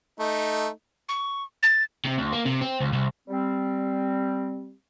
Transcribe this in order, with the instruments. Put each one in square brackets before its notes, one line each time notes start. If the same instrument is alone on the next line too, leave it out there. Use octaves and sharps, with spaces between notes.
[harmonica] A3 D#4
[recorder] C#6
A6
[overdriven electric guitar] C3
D2
A#3
C3
C4
C#2
C2
[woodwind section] G3 C4